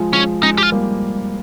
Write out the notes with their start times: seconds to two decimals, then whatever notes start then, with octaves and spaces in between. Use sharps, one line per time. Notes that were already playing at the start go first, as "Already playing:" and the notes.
Already playing: F3 G#3
0.13 F3 G#3 C#4
0.43 F3 G#3 D#4
0.58 G4
0.63 F4
0.72 G3 A#3